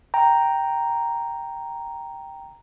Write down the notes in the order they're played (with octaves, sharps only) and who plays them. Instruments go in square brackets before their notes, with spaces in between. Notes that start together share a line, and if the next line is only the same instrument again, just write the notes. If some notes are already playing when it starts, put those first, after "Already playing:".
[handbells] G5 A#5